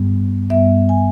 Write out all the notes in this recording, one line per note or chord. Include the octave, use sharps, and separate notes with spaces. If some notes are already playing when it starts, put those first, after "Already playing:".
Already playing: G2 G3 B3
G2 G3 B3 E5
G#5